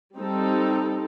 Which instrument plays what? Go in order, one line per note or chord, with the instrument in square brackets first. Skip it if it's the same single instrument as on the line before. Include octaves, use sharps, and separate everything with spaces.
[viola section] G3 C4 D#4 A4